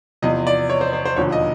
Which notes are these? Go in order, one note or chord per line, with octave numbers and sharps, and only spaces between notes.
E2 C3 F3 D#5
D5
C#5
C5
C5
C5
E1 D#2 D3 F3 C#5
D#5